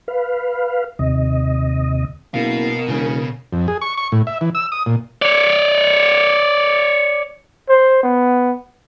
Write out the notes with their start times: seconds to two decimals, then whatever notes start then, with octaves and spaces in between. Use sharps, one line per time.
0.08 B4 F5
0.99 D#2 C3 D#5
2.34 F#1 B2 A#4 F5
2.89 E1 C#3 C#4
3.53 F2
3.68 G#4
3.81 C#6
3.97 C#6
4.12 A2
4.27 E5
4.41 E3
4.55 E6
4.72 D#6
4.86 A#2
5.22 C#5 D5
7.69 C5
8.03 B3